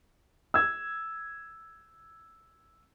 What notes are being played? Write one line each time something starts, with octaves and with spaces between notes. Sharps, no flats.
E6 G#6